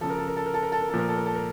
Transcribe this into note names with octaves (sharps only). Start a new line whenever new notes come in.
C#3 F3 A4
A#4
A4
A#4
A4
A#4
A4
A#4
A4
A#4
A#2 F3 A4
A#4
A4
A#4
A4
A#4